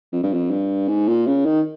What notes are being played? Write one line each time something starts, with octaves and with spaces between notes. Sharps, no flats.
F2
G2
F2
G2
G#2
A#2
C#3
D#3